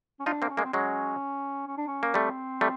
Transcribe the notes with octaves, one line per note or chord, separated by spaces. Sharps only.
C#4
D4 D#4 F4
A#3 C4
C#4
G#3 A#3
C4
F#3 G#3 C#4
C#4
D4
C#4
A#3
G3 A3 C4
G3 A3